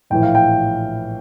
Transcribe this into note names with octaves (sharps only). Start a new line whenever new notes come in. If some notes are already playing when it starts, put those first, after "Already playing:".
A#1 A2 E3 G5
F5
G5